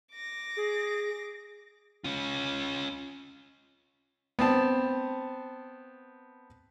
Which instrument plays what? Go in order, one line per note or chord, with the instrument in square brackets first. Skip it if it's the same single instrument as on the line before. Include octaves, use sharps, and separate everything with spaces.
[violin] D6 A#6
[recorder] G#4
[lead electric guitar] C#4 F4
[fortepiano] B3 C4 A5